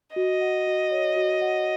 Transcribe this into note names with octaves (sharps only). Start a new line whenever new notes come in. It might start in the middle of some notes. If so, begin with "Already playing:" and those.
F#4 D#5
F#5
F#4
C#5
F#4
F#5